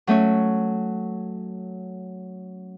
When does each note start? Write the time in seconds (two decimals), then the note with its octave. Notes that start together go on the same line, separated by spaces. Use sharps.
0.07 F#3 A3 C#4 C#5